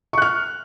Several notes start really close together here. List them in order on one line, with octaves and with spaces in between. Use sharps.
C#6 F#6 F6